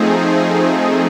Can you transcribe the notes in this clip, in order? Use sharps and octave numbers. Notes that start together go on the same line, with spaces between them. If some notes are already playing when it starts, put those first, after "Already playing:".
Already playing: F3 A3 C4 D#4 G#4